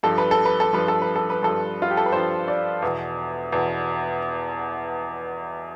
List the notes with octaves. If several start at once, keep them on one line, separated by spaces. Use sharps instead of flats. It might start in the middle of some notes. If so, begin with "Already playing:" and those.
G2 F3 A4
B4
A4
B4
A4
G2 F3 B4
A4
B4
A4
B4
G2 F3 A4
F4
G4
A4
B4
G2 F3 C5
D5
E2 B2
E2 B2